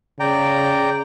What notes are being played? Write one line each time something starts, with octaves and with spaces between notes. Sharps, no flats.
C#3 D5 G5 A#5